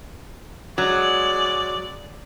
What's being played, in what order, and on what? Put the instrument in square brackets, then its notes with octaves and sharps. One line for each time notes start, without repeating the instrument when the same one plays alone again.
[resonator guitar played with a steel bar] F#3 [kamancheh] G#3 D5